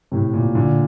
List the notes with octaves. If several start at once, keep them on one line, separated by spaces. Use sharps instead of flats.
A2 C3
A#2
A#2 D3